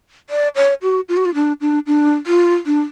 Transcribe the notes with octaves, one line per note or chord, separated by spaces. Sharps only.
D5
C#5
F#4
F4
F#4
F4
D4
D4
D4
F4
D4